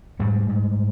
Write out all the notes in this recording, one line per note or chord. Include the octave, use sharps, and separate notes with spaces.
G#2 G3 A3
G#2